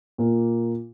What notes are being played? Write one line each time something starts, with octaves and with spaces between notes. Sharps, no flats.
A#2 A#3